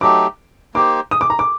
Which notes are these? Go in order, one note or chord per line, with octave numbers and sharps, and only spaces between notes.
F#3 A3 D#4 G4 D6
A#3 D#4 G4 C5 D6
D#6
D6
A#5
D6